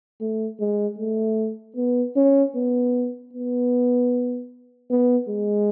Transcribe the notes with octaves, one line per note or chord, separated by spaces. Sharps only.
A3
G#3
A3
B3
C#4
B3
B3
B3
G#3